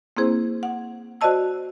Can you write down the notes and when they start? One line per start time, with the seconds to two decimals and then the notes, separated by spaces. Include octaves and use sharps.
0.17 A#3 C4 E4 G#4 C5
0.63 F#5
1.21 F#4 C5 D5 D#5 A5 E6